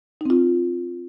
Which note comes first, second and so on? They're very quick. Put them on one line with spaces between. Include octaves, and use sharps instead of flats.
D#4 C4 F4